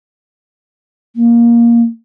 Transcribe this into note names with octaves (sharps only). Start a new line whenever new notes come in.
A#3